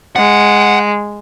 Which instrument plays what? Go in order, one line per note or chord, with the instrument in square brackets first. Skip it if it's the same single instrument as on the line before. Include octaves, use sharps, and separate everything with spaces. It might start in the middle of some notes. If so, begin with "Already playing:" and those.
[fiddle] G#3 [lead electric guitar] F#5